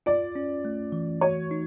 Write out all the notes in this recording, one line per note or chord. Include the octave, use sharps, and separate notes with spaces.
F4 D5
C#4
A3
E3
F#4 C#5
D#4